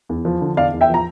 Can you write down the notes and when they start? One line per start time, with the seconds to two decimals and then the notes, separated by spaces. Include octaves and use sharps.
0.09 E2
0.25 F3
0.41 D3
0.57 E2 D5 F5
0.73 E2
0.81 E5 G5
0.89 F3
0.94 A#5